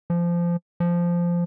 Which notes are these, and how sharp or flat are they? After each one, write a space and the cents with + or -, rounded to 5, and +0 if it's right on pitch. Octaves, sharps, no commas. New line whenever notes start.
F3 -20
F3 -10